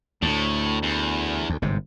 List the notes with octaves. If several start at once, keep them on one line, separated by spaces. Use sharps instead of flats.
D2 A2
E2
D2
G1 G#2 C3